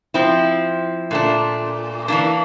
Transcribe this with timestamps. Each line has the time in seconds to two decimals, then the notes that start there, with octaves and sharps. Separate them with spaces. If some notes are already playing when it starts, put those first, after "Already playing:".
0.14 F3 C4 E4
1.11 A#2 A3 D4
2.08 E3 A#3 D4